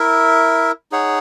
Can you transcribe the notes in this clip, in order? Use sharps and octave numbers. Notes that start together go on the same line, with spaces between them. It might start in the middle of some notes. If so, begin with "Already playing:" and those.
Already playing: E4 A#4 E5
D#4 G#4 C#5 F#5